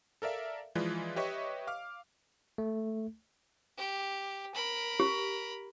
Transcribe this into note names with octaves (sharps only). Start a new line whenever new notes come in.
A4 A#4 D5 E5 F5
E3 F3 G#3 F4 B4 D5
G4 B4 C#5 D#5 E5 C#6
F5 D6 F6
A3
G4
A#4 B5
G4